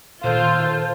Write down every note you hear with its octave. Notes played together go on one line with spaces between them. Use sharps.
A#2 D#3 F4 A4 C5